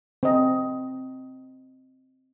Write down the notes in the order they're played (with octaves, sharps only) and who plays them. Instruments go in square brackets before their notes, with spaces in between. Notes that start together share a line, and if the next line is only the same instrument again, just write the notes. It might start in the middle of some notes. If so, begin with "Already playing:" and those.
[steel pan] C4 D#5